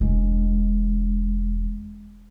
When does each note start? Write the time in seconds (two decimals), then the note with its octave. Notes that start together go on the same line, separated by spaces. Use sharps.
0.01 E1 G#3